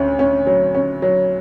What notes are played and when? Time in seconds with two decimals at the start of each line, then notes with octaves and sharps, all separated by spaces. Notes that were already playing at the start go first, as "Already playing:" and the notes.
Already playing: D2 C#4
0.19 C#4
0.47 F#3
0.75 C#4
1.02 F#3